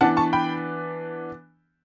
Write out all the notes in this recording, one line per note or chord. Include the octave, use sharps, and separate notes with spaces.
E3 B3 D4 F#5 A5
A5 C#6
G5 B5